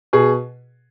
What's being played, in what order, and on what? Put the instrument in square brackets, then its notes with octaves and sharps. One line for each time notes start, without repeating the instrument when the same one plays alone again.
[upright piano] B2 G#4